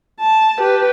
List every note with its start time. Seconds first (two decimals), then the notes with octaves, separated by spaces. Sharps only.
0.19 A5
0.59 G4 B4